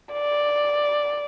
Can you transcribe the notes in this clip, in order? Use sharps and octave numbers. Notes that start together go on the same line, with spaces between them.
D5